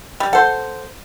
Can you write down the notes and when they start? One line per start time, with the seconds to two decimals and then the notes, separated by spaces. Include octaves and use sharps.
0.20 G3
0.33 A4 C5 F#5